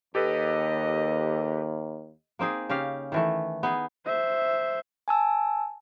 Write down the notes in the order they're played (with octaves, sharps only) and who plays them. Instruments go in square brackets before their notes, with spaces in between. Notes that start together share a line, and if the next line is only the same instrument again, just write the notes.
[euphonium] D#2 [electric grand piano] G4 A4 B4 [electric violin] D#5
[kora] A#3 C4 D#4 G#4
C#3 C#4 G4 F5
D#3 E3 A3
B3 D#4 G#4
[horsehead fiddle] C5 E5
[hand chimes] G#5 A5 E6